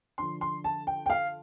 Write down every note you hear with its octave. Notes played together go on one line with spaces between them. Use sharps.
D3 F3 D4 C6
C6
A5
G5
G5
F5